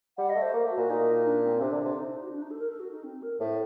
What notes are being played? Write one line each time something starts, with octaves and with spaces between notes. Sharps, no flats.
G3 F#5
D#5
A3
C5
A#3
A3
F#4
A#2
A#2 D#4
D4
C4
C3 D4
D3
C3
D#4
D4
D#4
F#4
D4
D#4
A4
A#4
A4
F#4
D#4
C4
A#4
A2 C5